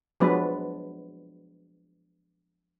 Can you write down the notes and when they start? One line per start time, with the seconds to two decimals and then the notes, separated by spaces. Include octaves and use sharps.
0.20 F3 F#3 G#3 B3 D4 B4